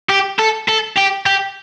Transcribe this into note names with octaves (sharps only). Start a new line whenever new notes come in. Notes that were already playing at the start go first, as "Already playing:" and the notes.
G4
A4
A4
G4
G4